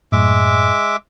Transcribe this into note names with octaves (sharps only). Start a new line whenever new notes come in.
F#2 A2 G#3 E5 D6